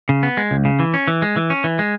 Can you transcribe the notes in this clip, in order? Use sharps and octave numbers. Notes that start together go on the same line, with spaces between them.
C#3
B3
G#3
C#2
C#3
E3
C#4
E3
G#3
E3
C#4
E3
G#3